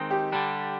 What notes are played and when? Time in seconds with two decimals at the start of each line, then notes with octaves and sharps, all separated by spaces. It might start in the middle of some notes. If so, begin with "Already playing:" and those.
Already playing: D#3 G#3 C4 D#4
0.11 G4
0.32 D3 G3 D4